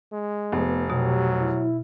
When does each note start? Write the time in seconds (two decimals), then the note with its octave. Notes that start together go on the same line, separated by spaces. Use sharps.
0.12 G#3
0.52 F1 B3
0.90 B2 F#3 G4
1.40 E4